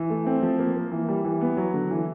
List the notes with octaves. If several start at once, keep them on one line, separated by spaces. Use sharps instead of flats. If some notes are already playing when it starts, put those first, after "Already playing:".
Already playing: E3
A3
C4
F3
A#3
A#3
E3
G3
E3
B3
F#3
D3
E3